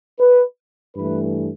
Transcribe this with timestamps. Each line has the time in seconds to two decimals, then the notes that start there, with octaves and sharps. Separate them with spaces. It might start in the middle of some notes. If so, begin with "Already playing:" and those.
0.19 B4
0.96 G2 E3 A3 B4